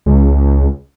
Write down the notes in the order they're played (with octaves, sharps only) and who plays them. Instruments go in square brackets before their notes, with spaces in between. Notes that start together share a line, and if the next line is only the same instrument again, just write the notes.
[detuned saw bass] C#2